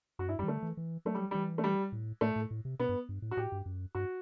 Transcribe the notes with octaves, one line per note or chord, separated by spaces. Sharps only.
F#2 F#4
G2 E4
F#2 G3
E3
D3 A3
E3
E3
F#3 A3
G3
E3 G3
A3
G3
A2
A2 A3
A2
A2
C3
B2 B3
G2
G2
A2
F#4
A2 G4
G2
F#2
G2 F#4